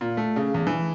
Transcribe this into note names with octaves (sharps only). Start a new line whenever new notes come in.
A#2
A3
C#3
E2
E3